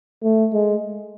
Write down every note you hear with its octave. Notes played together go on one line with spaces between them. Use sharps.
A3
G#3